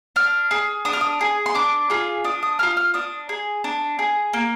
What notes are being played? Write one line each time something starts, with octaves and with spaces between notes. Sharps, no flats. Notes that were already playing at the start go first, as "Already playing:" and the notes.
D4 F6
G#4
D4 D#6
F6
D#6
G#4
C6
D4 D6
F4 G#4
D4 D#6
D#6
F4 G#4 F6
F6
D4 D#6
G#4
D4
G#4
A#3